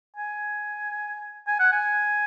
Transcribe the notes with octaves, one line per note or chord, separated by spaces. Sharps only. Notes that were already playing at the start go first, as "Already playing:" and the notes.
G#5
G#5
F#5
G#5